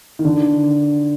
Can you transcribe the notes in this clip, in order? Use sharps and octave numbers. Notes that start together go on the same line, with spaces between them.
D#3
D3